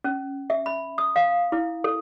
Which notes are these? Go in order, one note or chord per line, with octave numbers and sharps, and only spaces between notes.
C#4
E5
B5
D#6
F5
E4
A4